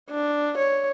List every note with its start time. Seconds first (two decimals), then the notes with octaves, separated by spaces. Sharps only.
0.10 D4
0.58 C#5